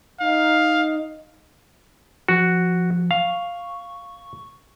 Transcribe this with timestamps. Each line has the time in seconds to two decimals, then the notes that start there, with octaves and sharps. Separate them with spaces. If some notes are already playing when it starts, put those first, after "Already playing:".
0.20 D#4 F5
2.28 F3 F#4
3.11 F5 C#6